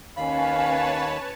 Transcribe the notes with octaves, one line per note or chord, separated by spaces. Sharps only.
D#2 C#4 B4 C#5 F5 A5 B5